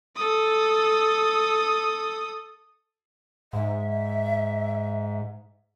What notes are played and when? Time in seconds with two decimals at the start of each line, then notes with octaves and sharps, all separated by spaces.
0.16 A4 D#6
3.53 G#2 E5